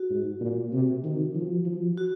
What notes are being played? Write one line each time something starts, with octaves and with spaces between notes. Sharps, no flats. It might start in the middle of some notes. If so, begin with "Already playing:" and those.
Already playing: F#4
G#2
A#2
C3
D#3
F3
F3
F#4